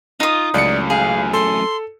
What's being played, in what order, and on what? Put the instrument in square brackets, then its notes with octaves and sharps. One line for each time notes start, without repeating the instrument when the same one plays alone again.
[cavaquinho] D#4 D#6 [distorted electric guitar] F4
[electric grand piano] C#2 C#7 [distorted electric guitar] F#2 A2 [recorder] D5
[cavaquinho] G#4 [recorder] F5
[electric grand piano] A4 [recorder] C6